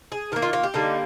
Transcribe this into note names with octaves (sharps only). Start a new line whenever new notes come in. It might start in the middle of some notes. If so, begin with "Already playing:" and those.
G#4
D#3 A#3 A#4
F4
F4
G4
D3 G3 A#3 D#4